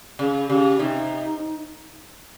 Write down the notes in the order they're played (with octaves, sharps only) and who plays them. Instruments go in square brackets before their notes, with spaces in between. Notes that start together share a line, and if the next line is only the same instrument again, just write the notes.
[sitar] C#3 [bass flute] G#4
[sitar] C#3 [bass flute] G4
[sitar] C3 [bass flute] D#4